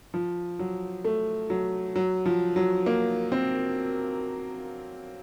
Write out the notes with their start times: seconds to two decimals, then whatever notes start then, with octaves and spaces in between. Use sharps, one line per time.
0.14 F3
0.59 F#3
1.04 A3
1.50 F#3
1.96 F#3
2.26 F3
2.56 F#3
2.86 A#3
3.32 C4